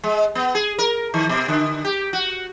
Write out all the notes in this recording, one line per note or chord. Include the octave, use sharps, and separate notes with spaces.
G#3
B3
G#4
A#4
D#3
B2
D3
G4
F#4